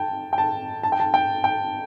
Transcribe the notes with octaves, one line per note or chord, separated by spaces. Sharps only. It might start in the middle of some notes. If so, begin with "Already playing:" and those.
Already playing: G5 A5
G5
A5
A5
G5
A5
G5
G5